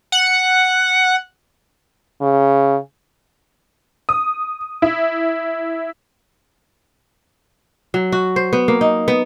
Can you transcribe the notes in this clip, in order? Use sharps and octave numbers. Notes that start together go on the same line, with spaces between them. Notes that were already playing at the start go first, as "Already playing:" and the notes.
F#5
C#3
D#6
E4
F#3
F#4
C5
B3
A#3
D#4
B3